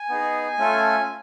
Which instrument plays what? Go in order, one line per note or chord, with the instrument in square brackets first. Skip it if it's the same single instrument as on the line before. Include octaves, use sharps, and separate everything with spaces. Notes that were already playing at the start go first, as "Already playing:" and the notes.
Already playing: [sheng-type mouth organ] G#5
B3 D#4 G#4
A3 C#4 F4 A4